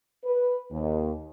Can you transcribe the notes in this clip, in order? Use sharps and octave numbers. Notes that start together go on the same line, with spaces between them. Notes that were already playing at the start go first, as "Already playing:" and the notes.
B4
D#2